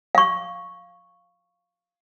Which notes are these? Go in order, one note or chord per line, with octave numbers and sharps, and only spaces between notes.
F5 C#6